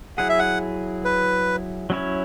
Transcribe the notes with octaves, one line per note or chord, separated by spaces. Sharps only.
F#3 E4 G#4 F#5
E5
F#5
B4
F#3 C#4 E4 C#5